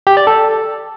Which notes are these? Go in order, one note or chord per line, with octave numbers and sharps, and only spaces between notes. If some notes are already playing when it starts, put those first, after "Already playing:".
G4
D5
A4